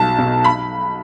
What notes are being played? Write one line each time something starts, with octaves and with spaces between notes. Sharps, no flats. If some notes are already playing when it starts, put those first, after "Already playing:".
Already playing: B1 F#3 A5
B2
B5